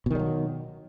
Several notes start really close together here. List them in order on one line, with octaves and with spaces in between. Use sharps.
B2 D#3 G3 F#3